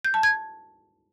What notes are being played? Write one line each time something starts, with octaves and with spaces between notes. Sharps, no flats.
G6
A5
G#6